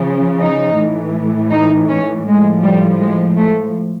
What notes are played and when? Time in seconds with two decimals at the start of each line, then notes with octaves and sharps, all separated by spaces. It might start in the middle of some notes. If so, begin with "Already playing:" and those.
Already playing: C#3 F3
0.40 D#4
0.78 A2 E3
1.51 D#4
1.88 C#4
2.25 A2 F3 G#3
2.63 G3
3.00 G#3
3.36 A3